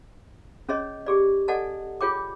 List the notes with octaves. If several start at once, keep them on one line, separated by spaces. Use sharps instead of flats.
C#4 G#4 C#5 D#5
G4 G#4 D5
A4 D5 D#5 F#5 G#5 A5
F4 G#4 C#5 G5 D6